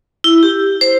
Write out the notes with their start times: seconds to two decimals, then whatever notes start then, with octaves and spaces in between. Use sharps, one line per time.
0.24 E4
0.43 G4
0.81 C5